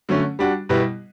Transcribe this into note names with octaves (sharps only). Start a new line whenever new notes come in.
D3 F#3 A3 C#4
G3 D4 F#4
B2 G3 B3 E4